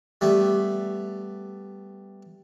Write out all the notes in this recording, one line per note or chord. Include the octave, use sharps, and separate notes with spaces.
G3 A3 B3